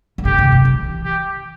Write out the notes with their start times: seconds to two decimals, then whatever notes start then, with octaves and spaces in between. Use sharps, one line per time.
0.18 E3
0.25 D3 G4
0.38 C#3
0.52 B2
0.65 E3
1.04 G4